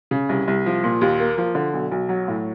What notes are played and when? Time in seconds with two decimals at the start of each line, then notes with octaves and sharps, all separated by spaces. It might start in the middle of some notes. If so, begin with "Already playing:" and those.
0.11 C#3
0.29 C2
0.48 C2
0.66 F3
0.84 A#2
1.01 D#2
1.20 A#3
1.38 F3
1.55 D3
1.73 B1
1.91 B1
2.09 F#3
2.28 A2